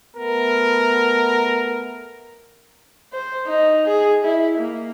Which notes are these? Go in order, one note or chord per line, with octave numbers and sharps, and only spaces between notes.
A3 B3 A#4
C5
D#4
G#4
E4
A#3